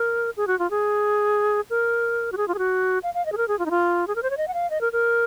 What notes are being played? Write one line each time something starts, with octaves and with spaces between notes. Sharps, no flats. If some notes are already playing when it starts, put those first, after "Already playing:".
Already playing: A#4
G#4
F#4
F4
G#4
A#4
F#4
G#4
F4
G#4
F#4
F5
F5
D#5
G#4
A#4
G#4
F4
D#4
F4
G#4
A#4
C5
C#5
D#5
F#5
F5
D#5
A#4
A#4